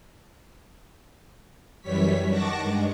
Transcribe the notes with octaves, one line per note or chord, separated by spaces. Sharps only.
F#2 E3 G3 C#5 B6
D#3 F#5 A5 C#6 D6 A#6
G2 G#3